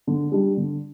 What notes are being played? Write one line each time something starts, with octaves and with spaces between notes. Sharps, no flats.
D3
G3 D4
D3